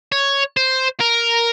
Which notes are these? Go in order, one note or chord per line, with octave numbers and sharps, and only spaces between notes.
C#5
C5
A#4